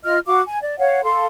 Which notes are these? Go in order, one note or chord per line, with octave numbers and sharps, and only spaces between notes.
F4 D#5 F6
F#4 F5 D6
G#5
D5
C#5 F5 F#5
A4 F5 C6